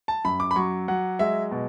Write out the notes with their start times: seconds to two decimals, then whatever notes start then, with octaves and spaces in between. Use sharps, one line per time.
0.08 A5
0.24 F#2 B5
0.40 D6
0.51 B5
0.56 F#3 C#6
0.88 F#3 F#5
1.19 G#3 E5
1.51 B2